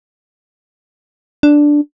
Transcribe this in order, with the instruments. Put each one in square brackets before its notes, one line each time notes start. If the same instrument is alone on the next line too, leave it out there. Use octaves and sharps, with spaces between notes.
[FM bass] D4